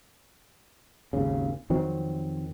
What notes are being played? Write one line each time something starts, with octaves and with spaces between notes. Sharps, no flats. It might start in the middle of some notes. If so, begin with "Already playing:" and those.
G#1 D#2 C#3
F2 D#3 F#3 C4